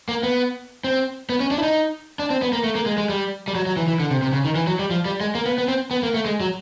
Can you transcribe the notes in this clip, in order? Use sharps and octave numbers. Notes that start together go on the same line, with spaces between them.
A#3
B3
C4
B3
C#4
D4
E4
D#4
D4
C4
B3
A#3
A3
A#3
G#3
G#3
G3
G3
F#3
F#3
E3
E3
D3
C3
C3
C#3
D#3
E3
F#3
G3
F3
G3
G#3
A#3
B3
B3
C4
B3
A#3
A3
G#3
F#3